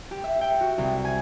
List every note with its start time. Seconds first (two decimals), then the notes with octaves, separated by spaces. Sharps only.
0.11 G4
0.24 E5
0.41 G5
0.61 F#4
0.78 C2
1.05 G#5